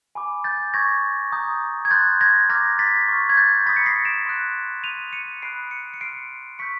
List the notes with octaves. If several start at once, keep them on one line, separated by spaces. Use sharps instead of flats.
G#5 B5 D6
G6 A6
C#6 E6 G6 G#6 A#6
A#5 D#6 G6
G#6
C6 D#6 F#6 G6 A6
G#6 A#6
A#5 D6 F6 G#6 A#6
A6 B6
C#6 F6
G#6
G6 A6
B5 D#6 G6 A6 B6
C#7
A#6 C7
D7 E7
C6 D#6 F#6
C6 D#6 G6 D#7 F7
C#7 D#7
B5 D#6 F#6 C7 D7
C#7 D#7
C#7
C6 F6 C7 D7
C#6 E6 G6 B6 C#7